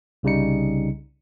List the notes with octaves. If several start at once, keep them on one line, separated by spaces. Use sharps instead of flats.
C2 C#3 G3 D#4 C#7